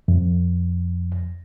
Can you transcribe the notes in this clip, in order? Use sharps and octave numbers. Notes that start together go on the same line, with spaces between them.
F2